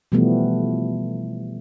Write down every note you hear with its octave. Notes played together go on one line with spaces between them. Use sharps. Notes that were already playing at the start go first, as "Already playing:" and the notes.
B2 E3 F3 G3 A3 B3